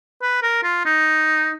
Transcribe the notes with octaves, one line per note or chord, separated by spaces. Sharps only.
B4
A#4
F4
D#4